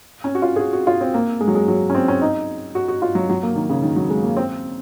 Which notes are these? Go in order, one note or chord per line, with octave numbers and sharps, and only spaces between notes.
C#4
F#4
F4
G#4
F#4
F#4
F4
C4
A#3
G#3
F#3
G#3
F#3
C#4
C4
C#4
D#4
F#4
F#4
F4
F#3
F#3
A#3
D#3
C#3
D#3
F#3
G#3
A#3
C4